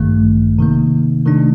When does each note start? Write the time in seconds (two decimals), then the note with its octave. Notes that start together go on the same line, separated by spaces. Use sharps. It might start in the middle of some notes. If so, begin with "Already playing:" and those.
Already playing: A1 G2 D#3 A3
0.59 C3 D#3 A#3
1.26 C3 D#3 A3 D4